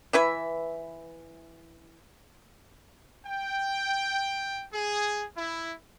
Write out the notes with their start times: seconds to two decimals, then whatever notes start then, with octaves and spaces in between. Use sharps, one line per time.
0.13 E3 E4 B4 E5
3.26 G5
4.72 G#4
5.36 E4